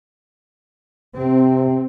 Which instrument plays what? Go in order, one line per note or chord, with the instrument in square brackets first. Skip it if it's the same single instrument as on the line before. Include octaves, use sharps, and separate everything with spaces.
[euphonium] C3 [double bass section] C4